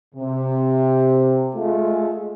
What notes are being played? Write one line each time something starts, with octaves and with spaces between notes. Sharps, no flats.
C3
G#3 A3 F4